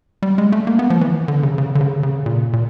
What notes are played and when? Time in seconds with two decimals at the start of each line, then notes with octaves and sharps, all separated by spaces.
0.22 G3
0.38 G#3
0.52 A3
0.67 A#3
0.79 B3
0.90 F3
1.01 E3
1.28 D3
1.43 C#3
1.58 C#3
1.75 D3
1.81 C#3
2.03 C#3
2.26 A#2
2.53 A#2